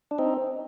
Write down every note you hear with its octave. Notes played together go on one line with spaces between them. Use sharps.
D4
C4 D#4